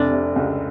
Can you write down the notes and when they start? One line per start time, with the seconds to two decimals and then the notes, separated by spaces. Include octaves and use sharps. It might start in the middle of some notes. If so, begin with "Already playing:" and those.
Already playing: F1 C3 D4
0.12 C3
0.36 C#2